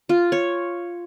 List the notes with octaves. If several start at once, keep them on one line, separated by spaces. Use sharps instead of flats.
F4
C#5